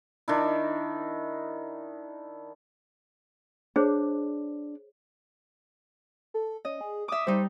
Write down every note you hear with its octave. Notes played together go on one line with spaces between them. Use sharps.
D#3 D4 E4
D4 G#4 C5 C#5
A4
C#4 D#5
G#4
E5 D6 D#6
G3 D#4 C5